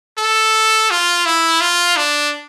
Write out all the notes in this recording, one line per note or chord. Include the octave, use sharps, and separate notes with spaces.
A4
F4
E4
F4
D4